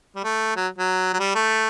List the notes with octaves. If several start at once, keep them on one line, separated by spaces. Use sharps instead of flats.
G3
A3
F#3
F#3
F#3
G3
A3